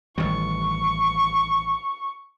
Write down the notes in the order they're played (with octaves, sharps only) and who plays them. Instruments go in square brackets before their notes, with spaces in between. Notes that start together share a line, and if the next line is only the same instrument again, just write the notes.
[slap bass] A1 D#3 G3 [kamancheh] C#6